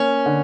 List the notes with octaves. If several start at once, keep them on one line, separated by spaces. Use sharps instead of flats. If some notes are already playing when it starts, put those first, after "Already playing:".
Already playing: A#3 C#4
D3